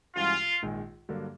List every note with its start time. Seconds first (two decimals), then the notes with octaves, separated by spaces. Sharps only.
0.15 G2 E3 G#3 C#4 F4 F#4
0.62 A#1 G#2 D#3 G#3
1.09 G2 D3 F#3 A#3